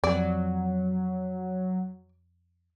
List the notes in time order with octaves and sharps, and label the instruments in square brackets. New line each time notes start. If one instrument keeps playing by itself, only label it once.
[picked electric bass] F2 [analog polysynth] F#3 [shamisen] D5